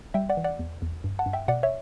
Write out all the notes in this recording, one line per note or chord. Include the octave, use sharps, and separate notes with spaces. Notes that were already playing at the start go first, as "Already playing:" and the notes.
G3 E5 G5
D5 F#5
E3
D5 F#5
E2
E2
G2
F#5 A5
G2
E5 G5
B2 D5 F#5
C#5 E5